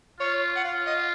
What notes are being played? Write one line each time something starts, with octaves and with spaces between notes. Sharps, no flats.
F4 C#5
F#5
F4 F5
D#5